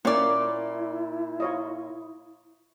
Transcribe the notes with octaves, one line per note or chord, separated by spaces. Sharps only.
A#2 A#3 C#4 E4 C#5 D5
F4 C#5 D#5